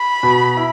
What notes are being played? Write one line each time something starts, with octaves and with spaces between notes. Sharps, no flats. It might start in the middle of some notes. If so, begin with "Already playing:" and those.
Already playing: B5
B2
E4